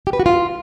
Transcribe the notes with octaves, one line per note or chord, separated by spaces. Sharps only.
G4
B4
F#4
F4